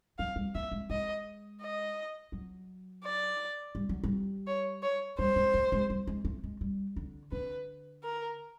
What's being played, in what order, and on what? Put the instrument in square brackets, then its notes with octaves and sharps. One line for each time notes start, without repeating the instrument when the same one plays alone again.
[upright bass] F#3 [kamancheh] F5
[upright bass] G3
[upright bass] A#3 [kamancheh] E5
[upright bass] G#3
[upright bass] G#3 [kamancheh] D#5
[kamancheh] D#5
[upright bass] F#3
[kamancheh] D5
[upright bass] G3
F#3
G3
[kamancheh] C#5
C#5
[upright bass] G3 [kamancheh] C5
[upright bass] G#3
A3
G#3
G3
G#3
A3
G#3
G3
D3
[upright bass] D3 [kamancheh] B4
[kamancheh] A#4